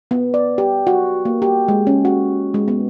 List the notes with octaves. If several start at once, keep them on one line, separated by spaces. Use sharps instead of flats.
B3
D5
G4
F#4
A#3
G4
G#3
C#4
F#4
G#3
B3